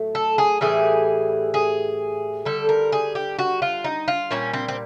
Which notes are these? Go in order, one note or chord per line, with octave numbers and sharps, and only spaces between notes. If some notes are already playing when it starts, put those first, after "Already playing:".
Already playing: A2 F#3 A3
A4
G#4
A2 E3 G3 G#4
G#4
D3 G3 A4
A#4
G#4
G4
F#4
F4
D#4
F4
A#2 G3 C#4
C4
C4